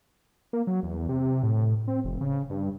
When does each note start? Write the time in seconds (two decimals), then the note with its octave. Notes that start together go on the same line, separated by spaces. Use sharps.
0.53 A#3
0.67 F#3
0.83 E2
1.09 C3
1.43 A2
1.88 C4
2.04 F1
2.21 C#3
2.50 G2